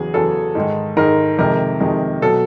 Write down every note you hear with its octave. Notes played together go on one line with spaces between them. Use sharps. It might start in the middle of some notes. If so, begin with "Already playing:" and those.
Already playing: E2 C#3 F#3 G#4
E2 C#3 F#3 A4
G#2 D#3 G#3
G#2 D#3 G#3 A#4
F2 C3 D#3 G#3 A#4
F2 C3 D#3 G#3
B2 F#3 A4